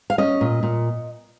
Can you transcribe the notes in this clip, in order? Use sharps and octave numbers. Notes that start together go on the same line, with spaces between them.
F5
C#4 D#5
A#2
A#2